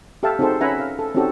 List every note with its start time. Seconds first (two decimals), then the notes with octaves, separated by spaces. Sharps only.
0.23 G4 A4 E5 F5 G5 A5
0.39 C4 D#4 F#4 G#4 A4 C5
0.61 C#4 B4 E5 F#5 G#5 A#5
0.80 F5
0.99 A4
1.15 C4 C#4 D#4 F#4 G4 A4